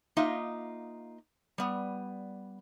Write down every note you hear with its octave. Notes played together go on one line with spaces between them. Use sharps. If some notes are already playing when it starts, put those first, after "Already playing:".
A#3 D#4 F4 D#5 E5
G3 B3